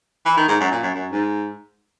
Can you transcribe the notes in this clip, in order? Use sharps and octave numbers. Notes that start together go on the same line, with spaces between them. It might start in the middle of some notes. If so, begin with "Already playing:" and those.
E3
D#3
G#2
F#2
A#2
F#2
F#2
G#2